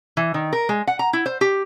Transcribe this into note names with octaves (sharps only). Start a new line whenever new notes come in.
E3
D#3
A#4
G#3
F#5
A#5
E4
C5
G4